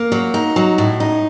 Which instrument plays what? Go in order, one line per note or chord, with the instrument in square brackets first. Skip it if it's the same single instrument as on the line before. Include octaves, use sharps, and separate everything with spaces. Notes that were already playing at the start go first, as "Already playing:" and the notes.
Already playing: [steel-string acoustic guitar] A#3
F#3
D#4
F#3
A2
D#4